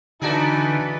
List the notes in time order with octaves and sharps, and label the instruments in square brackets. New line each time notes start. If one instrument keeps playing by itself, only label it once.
[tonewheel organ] D3 [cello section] E3 A4 B4 [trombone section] D4 D#4 [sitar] F#4 G#4